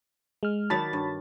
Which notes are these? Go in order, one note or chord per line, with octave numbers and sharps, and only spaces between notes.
G#3 F6
D#3 F#3 D5 A5 B5 A6
G2